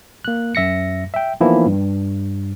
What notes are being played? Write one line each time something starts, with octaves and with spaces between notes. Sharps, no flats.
A#3 F#6
F#2 E5 A#6 C#7
E5 G5
E3 F3 A#3 B3 D#4 E4
G2